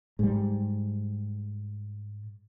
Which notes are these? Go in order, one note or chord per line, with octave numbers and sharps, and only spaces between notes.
G#2 G3